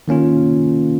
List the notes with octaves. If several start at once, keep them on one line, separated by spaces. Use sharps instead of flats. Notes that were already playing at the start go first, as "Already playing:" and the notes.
D#3 A#3 C#4 F4